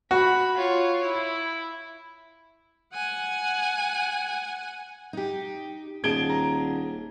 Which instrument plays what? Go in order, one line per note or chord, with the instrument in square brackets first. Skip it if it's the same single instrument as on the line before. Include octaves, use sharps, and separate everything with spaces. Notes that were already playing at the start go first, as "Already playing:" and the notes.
[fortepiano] F#4 [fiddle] B5
[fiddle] F4 C#5
E4
[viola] F#5 G#5
[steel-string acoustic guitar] D#4 G4
[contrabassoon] D#1 [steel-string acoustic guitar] G#4 A5 [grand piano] G#6 D7 G7
[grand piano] A#5